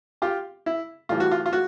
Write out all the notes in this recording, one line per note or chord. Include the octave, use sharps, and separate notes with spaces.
F4 G4
E4
A2 E3 G3 F4
F#4
F4
F4
F#4